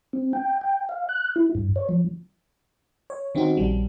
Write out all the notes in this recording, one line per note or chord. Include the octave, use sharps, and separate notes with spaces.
C4
G5
G5
F5
F#6
E4
G2
C#5
F3
C#5
D#3 C4 C#4 D#4 F#4
A#1 G3